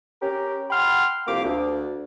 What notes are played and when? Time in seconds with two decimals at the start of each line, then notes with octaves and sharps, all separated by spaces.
0.22 C#4 G4 A#4
0.71 F#5 G5 B5 C6 F6
1.27 C2 F2 A#3 G4 F5 D6
1.43 D2